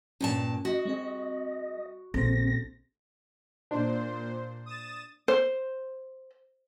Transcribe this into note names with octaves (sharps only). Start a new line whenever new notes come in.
G2 A#2 C#4 A5
F#4 D#5
G3 C4 G#4
A#1 D3 C4 A4 C5 A#6
A#2 D4 C5
D#6 A6 E7
C5